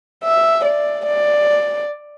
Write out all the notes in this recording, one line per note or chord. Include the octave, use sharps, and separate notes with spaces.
E5
D5
D5